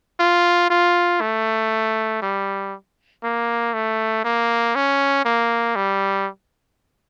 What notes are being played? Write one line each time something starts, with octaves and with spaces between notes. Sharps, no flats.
F4
F4
A3
G3
A#3
A3
A#3
C#4
A#3
G3